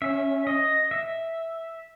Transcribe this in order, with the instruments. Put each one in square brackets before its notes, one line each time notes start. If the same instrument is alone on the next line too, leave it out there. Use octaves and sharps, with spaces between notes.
[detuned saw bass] C#4 [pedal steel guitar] E5
[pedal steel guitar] D#5
E5